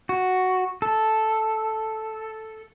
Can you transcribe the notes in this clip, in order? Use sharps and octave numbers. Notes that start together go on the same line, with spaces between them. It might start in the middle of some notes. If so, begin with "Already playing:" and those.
F#4
A4